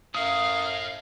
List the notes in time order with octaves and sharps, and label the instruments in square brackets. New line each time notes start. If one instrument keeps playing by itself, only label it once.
[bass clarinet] F#2 [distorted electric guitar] A2 [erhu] F5 [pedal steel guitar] D#6